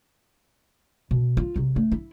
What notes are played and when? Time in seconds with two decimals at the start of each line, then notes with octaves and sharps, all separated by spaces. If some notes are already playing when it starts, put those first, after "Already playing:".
1.11 B2
1.37 F4
1.56 C3 F#3
1.76 A3
1.92 E4